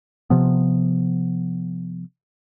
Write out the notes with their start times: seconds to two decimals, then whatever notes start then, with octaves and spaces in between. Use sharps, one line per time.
0.30 C3 F3 B3